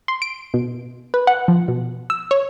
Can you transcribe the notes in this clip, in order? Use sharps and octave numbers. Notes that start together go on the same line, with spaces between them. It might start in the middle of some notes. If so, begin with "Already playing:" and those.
C6
D7
B2
B4
F#5
F3
B2
E6
C#5